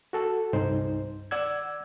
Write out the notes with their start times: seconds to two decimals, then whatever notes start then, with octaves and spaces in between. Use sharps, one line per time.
0.13 F#4 A4
0.53 C2 G2 D#4 C5
1.31 D5 F#5 E6 G#6